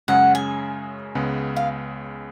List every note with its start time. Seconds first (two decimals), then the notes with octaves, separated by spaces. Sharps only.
0.08 F#2 C#3 G#3 C#4 F#5
0.35 G#5
1.15 C#2 C#3 G#3 B3
1.56 F5